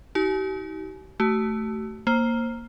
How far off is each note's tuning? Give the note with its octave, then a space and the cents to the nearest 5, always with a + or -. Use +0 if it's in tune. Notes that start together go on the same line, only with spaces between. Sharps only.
D#4 +45 G4 -40 G#5 +40
A3 +0 F#4 +40
A#3 +0 C5 +15